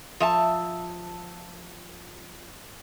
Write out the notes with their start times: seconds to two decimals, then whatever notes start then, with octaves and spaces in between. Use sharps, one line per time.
0.20 F3 E5 A5